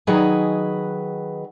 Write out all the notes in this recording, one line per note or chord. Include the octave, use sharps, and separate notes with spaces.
D#3 F#3 G#4 B4 D#5 G#5